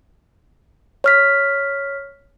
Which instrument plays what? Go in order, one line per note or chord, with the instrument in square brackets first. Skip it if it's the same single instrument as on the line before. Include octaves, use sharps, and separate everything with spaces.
[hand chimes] C#5 F6 B6